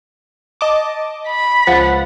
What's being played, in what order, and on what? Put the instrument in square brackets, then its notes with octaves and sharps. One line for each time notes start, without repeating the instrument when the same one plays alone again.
[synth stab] D#5 A5 D6
[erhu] B5
[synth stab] C#2 F#5 A6 [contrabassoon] F3